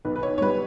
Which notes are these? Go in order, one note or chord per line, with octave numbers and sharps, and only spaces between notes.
B1 B4
B4
C#5
C#5
G3 B4